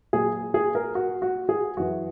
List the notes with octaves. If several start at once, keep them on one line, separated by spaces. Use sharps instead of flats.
A#2 F#3 G#4
G#4
A#4
F#4
F#4
G#4
F#2 E3 F#4